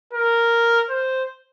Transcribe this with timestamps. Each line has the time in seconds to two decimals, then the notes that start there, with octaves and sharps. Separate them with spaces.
0.13 A#4
0.90 C5